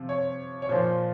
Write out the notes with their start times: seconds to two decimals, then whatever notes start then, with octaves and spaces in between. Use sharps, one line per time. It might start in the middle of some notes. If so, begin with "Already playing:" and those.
Already playing: C3 F3
0.09 C#5
0.62 C#5
0.69 A#2 F3 C5